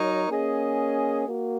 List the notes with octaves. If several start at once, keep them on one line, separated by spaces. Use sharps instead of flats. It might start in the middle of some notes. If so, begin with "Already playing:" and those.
Already playing: F#3 D#4 A#4 C#5
A#3 C#4 G#4 D#5
A#3 F#4